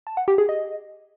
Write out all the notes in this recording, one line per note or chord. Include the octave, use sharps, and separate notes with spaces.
A5
F#5
G4
G#4
D#5